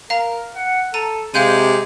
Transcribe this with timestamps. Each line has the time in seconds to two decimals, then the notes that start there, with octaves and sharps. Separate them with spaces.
0.10 A#4 F5 A#5
0.56 F#5
0.94 A4 A#5 D#7
1.34 C3 G#3 G4 F5 G6 D#7